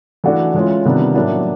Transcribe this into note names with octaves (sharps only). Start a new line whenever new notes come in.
E3 A3 D4 F#4
E3 G#3 C#4 F4
C3 D#3 G3 B3 D4
A2 F#3 A#3 D4 F#4